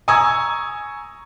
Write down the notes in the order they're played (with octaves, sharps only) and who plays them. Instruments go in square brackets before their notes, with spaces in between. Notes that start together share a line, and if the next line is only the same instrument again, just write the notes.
[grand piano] G#5 A#5 C#6 D#6 E6 G#6